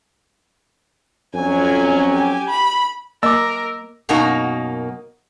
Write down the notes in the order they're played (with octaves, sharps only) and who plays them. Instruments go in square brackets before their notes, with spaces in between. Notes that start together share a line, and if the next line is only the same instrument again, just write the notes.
[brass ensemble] F2 F#3 C#4 [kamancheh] G#5
[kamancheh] G4 G#5
B5
[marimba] A#3 [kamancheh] A#4 [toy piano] D#5 D6 [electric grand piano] E6
[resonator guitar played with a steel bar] F#2 B2 A#3 D#4 A#5